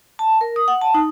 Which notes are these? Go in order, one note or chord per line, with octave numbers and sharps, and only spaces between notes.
A5
A#4
D#6
F#5
A5
D#4